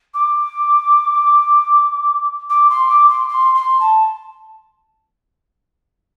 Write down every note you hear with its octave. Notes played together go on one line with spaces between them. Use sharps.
D6
D6
C6
D6
C6
C6
C6
A5